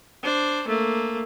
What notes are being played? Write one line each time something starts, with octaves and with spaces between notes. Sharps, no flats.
D4 C5
A3 A#3